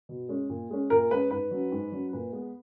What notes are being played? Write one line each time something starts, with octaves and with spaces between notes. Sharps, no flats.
B2
G#3 C#4
A#2
G#3 C#4
A#2 A#4
G#3 C#4 B4
G#2 B4
F#3 C#4
G#2
F#3 C#4
A#2 B4
G#3 B3